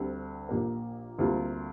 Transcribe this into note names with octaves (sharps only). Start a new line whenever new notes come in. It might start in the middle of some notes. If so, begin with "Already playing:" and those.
Already playing: D2 D3 G3 C4
A#1 A#2 A#3 G4 A#4
D2 C3 G3 A#3 F4